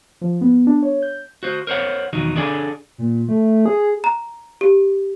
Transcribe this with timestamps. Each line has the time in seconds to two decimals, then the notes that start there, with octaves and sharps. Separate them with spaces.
0.21 F3
0.41 B3
0.67 D4
0.83 C#5
1.02 G6
1.43 F#4 C5
1.67 A#4 C5 C#5 F#5
2.13 B1 E2 D#3 D#4 F#4
2.36 D4 G#4 A4 D5 G5 G#5
2.98 A#2
3.29 A3
3.66 G#4
4.04 A#5
4.61 G4